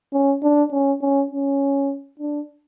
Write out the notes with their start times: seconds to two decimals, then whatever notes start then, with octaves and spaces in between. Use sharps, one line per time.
0.13 C#4
0.43 D4
0.72 C#4
1.01 C#4
1.31 C#4
2.20 D4